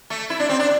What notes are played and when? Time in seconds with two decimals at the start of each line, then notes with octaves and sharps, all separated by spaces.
0.10 A3
0.30 E4
0.39 D4
0.49 C4
0.59 D4